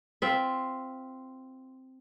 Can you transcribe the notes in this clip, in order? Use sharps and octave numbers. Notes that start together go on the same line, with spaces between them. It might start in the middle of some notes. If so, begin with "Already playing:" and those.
C4 F4 E5